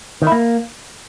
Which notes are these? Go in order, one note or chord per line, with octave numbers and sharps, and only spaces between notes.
D#3
E4
A#3